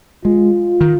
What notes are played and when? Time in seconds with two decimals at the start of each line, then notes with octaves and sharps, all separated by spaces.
0.25 G#3 F4
0.81 D#3